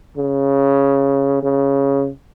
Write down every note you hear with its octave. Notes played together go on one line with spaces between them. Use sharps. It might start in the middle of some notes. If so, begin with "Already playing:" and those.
C#3
C#3